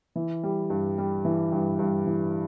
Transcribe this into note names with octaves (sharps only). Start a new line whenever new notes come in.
E3
G3
G2
G3
E3
G2
G2
E3